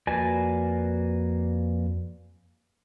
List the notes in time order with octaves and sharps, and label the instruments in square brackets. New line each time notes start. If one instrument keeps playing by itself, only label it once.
[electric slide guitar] F2 A#3 F#4 B4 D5 G#5